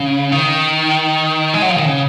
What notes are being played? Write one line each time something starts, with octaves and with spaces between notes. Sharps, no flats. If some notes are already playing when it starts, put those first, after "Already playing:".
Already playing: C#3
D#3
G#3
F#3
F3
D#3
C#3